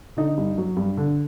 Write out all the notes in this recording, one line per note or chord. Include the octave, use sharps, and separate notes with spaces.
D3 D#4
G2
F#3
G2
D3